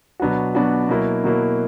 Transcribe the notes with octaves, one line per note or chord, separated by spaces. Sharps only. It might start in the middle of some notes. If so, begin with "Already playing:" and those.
B2 F#3 B3 D4 F#4
B2 F#3 B3 D4 F#4
B2 F#3 A#3 E4
B2 F#3 A#3 E4